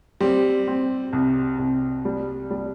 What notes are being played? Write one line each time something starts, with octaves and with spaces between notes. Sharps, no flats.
G3 C4
C4
C2
C2
G3
G3